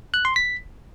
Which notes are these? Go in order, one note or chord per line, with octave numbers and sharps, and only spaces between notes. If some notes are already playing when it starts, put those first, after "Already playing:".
F#6
C6
B6